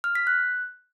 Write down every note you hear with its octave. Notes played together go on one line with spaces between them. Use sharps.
F6
B6
F#6